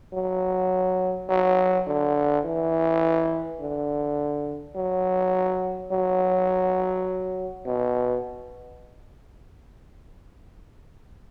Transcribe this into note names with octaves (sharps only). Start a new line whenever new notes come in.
F#3
F#3
D3
E3
D3
F#3
F#3
B2